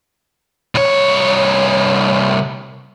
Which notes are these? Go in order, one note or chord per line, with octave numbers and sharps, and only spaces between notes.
C2 C#5